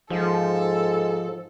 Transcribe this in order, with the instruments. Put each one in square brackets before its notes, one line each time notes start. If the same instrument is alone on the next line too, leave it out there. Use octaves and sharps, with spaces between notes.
[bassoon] G#2 [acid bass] F3 [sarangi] A4